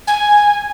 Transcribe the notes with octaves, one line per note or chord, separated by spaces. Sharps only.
G#5